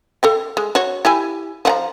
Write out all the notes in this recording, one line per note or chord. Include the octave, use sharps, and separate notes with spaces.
A4 F5 G5
G#3
F#4 C#5
E4 G4 G#5
F3 F#5 A#5